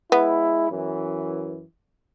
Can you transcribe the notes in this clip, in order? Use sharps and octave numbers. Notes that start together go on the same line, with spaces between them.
G#3 B3 E4
F#2 E3